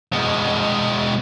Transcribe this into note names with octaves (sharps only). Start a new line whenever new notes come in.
B2 G#3